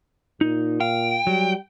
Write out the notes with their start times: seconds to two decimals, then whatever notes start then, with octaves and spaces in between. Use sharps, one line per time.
0.41 A#2 D#4
0.80 F5 G5
1.27 F#3 G3